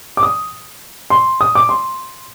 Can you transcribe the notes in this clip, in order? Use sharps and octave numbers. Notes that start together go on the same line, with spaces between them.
D6
D#6
C6
D#6
D6
C6